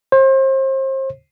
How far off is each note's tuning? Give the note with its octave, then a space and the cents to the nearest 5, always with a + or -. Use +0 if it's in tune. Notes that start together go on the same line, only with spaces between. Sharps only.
C5 +35